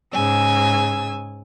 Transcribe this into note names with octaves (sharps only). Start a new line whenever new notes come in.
G#2 C#3 G#5 E6